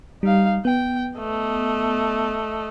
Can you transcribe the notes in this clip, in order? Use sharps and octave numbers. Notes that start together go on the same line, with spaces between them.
G3 D#4 F5
B3 G5
A3 D#5